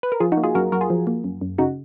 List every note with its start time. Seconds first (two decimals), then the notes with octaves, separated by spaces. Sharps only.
0.03 B4
0.12 A#4
0.20 F3 F4 G#4
0.32 D#4 F#4
0.37 A#3
0.44 F4 G#4
0.55 F#2 F#4 A#4
0.72 F#2 F#4 A#4
0.81 F4 G#4
0.90 F3
1.07 A#3
1.24 F#2
1.41 F#2
1.58 C#3 D#4 F#4